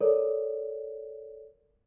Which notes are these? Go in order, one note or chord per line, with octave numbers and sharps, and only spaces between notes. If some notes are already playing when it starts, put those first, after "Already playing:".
A4 A#4 C#5 D5